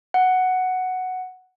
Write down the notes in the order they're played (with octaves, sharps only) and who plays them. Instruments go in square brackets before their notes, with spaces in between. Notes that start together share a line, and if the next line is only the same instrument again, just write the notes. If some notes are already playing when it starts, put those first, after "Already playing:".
[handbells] F#5